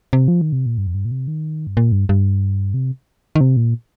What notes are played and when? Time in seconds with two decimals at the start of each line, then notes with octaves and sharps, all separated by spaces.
0.13 C3
0.28 F3
0.41 D#3
0.53 C3
0.66 A#2
0.78 G2
0.87 F2
0.94 G2
1.05 A#2
1.11 C3
1.28 D#3
1.67 G2
1.77 A#2
1.92 G2
2.09 G2
2.74 C3
3.35 D#3
3.41 C3
3.57 A#2